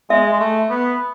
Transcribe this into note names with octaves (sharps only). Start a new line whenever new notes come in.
G#3 E5
G#3
A3
B3